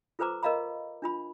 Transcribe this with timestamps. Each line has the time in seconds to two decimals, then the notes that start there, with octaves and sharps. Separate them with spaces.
0.19 F4 A4 B4 C5 A#5 D6
0.43 A#4 D#5 F5 A#5 B5
1.02 D4 F4 B5